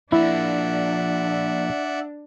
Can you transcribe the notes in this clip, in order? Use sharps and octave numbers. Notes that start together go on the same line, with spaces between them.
F3 A#3 D4 E4 D5 E5 F#5